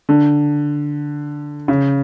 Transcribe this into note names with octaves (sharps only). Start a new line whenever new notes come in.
D3
C#3